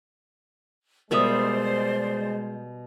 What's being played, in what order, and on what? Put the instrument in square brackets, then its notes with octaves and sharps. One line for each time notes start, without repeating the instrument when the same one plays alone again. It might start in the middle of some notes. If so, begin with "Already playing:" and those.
[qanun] B2 G3 E5 [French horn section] G#3 [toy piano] A#4 D#6 [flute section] C5 D5